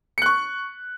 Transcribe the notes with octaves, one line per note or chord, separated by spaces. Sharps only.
C#6 F#6 C#7